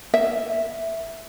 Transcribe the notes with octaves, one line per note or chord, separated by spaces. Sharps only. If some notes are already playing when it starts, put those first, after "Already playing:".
E5